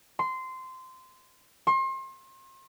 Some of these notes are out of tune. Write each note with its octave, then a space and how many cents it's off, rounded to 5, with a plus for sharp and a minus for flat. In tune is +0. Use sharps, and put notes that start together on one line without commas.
C6 -15
C6 +35